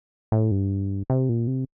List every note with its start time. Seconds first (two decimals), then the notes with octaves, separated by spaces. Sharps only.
0.32 A2
0.51 G2
1.10 C3
1.29 A#2
1.47 C3